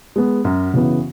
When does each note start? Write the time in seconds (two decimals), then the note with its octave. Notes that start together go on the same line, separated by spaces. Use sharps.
0.16 G#3 B3
0.45 F#2 F#4
0.74 C#3 E3 B3